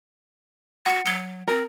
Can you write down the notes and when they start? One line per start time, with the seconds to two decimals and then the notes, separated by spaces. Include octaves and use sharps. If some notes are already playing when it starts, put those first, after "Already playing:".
0.86 F#4 F#5 C#7
1.06 F#3 C#7 G7
1.48 C4 A#4